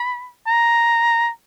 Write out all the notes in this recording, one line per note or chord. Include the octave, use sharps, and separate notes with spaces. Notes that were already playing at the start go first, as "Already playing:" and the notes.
Already playing: B5
A#5